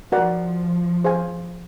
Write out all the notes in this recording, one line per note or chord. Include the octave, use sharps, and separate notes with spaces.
F3 F#4 A#4 D5 F#5
G#4 C5 F5 G#5